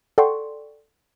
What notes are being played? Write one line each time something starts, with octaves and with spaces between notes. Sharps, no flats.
A4 D5 F#5 G5 C6 C#6